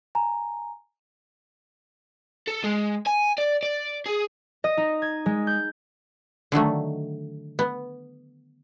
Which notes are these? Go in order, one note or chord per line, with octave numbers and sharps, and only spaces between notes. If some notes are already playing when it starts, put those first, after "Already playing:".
G#5 A#5
A4
G#3
G#5
D5
D5
G#4
D#5
D#4
G#6
G#3
G6
D3 D#3 F#3 A3
B3